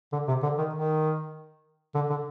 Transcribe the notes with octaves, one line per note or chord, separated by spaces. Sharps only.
D3
C3
D3
D#3
D#3
D3
D3